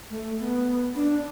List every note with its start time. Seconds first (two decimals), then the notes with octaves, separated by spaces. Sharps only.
0.10 A3
0.39 B3
0.95 D4